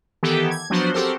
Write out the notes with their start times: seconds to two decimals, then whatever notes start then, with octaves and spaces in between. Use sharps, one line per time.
0.23 D#3 E3 B3 G4 A4
0.50 G#6
0.70 F3 F#3 B3 D4 F#4 C5
0.94 C4 F#4 G4 A4 A#4 C5